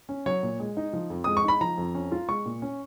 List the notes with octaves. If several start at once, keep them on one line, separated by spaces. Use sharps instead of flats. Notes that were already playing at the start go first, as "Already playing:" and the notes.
C#4
F#3 C#5
A#2
G#3
D#4
F3
F2
G#3 D#6
C#6
D#4 B5
F3 A#5
F2
C#4
F4
G#3 C#6
A#2
C#4